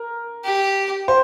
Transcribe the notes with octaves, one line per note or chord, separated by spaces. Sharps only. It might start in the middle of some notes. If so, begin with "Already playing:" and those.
Already playing: A#4
G4
C5